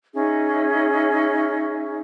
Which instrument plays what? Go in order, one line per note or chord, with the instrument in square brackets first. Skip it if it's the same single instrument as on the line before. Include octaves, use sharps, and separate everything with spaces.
[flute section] C#4 D#4 G#4 E5